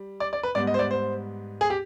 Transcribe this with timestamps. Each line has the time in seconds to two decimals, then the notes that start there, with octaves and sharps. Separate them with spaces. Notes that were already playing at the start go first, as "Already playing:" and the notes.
Already playing: G3
0.20 D5
0.33 D5
0.43 B4
0.55 G#2 G3 B3 D5
0.67 D#5
0.74 C5
0.79 D5
0.91 C5
1.61 G#4
1.70 G4